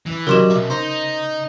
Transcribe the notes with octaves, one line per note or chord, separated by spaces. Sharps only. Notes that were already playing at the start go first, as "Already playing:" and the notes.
E3
C#3 F#3 G3 A#4 D#5 C6 E7
B1 E5
D#4 C5 A#5